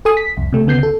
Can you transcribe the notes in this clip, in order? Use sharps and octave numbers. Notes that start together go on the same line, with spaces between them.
A4 G#5 D#6
B6
C2 F2
C3 A3
D2 C#3 B3 G6 C7
A4